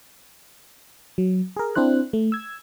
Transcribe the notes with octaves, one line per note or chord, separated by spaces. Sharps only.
F#3
G#4 A#4
C4 D4 E4 C5 F#6
A3
E6 G#6